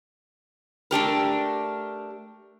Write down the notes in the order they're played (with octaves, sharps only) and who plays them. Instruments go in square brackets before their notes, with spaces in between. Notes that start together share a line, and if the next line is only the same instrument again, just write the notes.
[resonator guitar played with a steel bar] A3 D4 G4 A#4